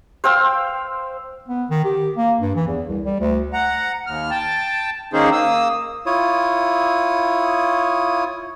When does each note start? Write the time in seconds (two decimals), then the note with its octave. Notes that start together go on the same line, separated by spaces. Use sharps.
0.24 C5 F5 G5 E6
1.48 B3
1.70 D#3
1.85 G4
2.17 A#3
2.40 G2
2.55 E3
2.67 E2
2.88 C2
3.05 G3
3.20 D2
3.52 F#5 A#5
4.07 D#2 F6
4.30 G5 A5
5.13 D#3 A#3 C#4 D#4 G#4 C5
5.32 A#3 D#6 E6
6.06 E4 F4 C#5 D#6